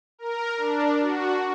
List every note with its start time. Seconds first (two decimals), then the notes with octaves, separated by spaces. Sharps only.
0.19 A#4
0.57 D4
1.01 F#4